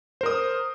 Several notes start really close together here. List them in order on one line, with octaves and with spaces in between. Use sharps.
C5 A#4 D#6